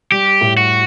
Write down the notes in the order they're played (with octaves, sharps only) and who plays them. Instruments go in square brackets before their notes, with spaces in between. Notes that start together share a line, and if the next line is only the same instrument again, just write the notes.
[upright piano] G3 [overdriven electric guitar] G4
[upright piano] A2
[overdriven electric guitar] F#4